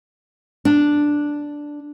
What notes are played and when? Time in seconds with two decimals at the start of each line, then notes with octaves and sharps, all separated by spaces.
0.65 D4